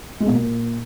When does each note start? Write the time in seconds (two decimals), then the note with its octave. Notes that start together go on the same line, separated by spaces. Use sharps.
0.20 G#3
0.26 B2
0.33 A#2